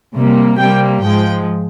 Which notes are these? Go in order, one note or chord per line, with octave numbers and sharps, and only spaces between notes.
C3 G3 A#3
C3 G3 A#3 G5
G#2 F3 G#3 G5